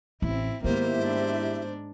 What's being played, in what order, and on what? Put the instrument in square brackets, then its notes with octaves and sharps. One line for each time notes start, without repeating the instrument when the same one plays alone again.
[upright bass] A1 [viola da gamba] C4 E4
[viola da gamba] G#2 D#3 A#3 [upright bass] B3 [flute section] E4 G4 E5 [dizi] C5
[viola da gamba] G#2 D4